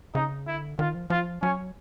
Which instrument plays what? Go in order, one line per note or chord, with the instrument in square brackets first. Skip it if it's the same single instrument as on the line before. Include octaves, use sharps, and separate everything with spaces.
[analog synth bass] C#3 [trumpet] D#4
[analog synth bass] D3 [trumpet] E4
[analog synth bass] D#3 [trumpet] F4
[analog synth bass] F3
[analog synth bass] F3 [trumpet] F4
[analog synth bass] F#3 [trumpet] C#4